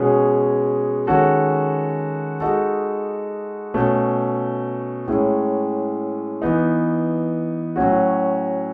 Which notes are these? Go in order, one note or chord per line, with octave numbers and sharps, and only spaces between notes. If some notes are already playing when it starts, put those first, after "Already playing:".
Already playing: B2 G#3 C#4 G#4
D#3 G#3 C#4 F#4 A4
G#3 D#4 F#4 A4
B2 A3 C#4
A2 G#3 C#4 E4
E3 B3 D#4
A2 F#3 C#4 F#4